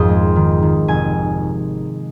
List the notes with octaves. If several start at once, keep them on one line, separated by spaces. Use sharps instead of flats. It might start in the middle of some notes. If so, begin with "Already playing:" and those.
Already playing: G#1 F2 G#2 C6 D#6
G#3
D#3
D#3
F1 G#5